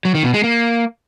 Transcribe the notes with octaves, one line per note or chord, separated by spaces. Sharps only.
F#3
D#3
B2
G#3
A#3